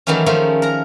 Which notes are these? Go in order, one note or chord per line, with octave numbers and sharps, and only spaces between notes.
D#3 E3 F#3 A3 C#4
D#3 F3 G#3 A3 C#4
A#4 A#5